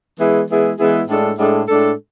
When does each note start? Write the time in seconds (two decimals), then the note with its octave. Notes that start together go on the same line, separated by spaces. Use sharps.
0.18 E3 G#3 B3 E4 G#4
0.48 E3 G#3 B3 E4 G#4
0.78 E3 G#3 B3 E4 G#4
1.08 A2 G#3 D4 A4
1.38 A2 G#3 D4 A4
1.68 A2 G#3 D4 A4